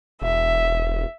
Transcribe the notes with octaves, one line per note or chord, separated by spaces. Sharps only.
E1 E5